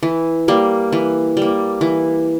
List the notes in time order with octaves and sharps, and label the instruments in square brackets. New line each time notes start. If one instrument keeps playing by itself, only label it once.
[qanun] E3
G3 A#3
E3
G3 A#3
E3